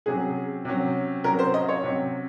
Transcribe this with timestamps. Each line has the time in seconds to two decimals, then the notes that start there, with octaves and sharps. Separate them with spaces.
0.06 C3 F#3 C#4 G#4
0.65 C3 F#3 C#4
1.24 C3 F#3 C#4 A#4
1.39 C5
1.54 D#5
1.69 C#5
1.83 C3 F#3 C#4